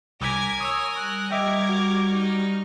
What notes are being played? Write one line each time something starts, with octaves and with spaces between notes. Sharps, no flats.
C2 A#4 G#5 D6 G#6 B6
C#5 D#6 E6
G3 C#6 F6 F#6
A#4 D#5 E5 G5 D6 G#6
F#4
D#4